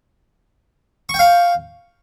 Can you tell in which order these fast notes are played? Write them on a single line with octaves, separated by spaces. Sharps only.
C#6 G5 F5